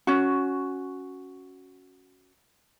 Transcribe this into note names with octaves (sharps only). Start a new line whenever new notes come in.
C#4 F#4